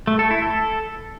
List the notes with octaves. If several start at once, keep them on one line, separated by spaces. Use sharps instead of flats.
A3
A4
E4
A4